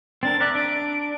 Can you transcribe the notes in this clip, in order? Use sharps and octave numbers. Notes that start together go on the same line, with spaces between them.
C4 D4 A#4 A6
A#4 D5 E5 F#6
D4 D7